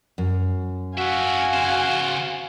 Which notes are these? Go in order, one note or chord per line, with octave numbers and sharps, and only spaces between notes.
F#2
C#4 F#4 E5 F5 G#5
C#3 C5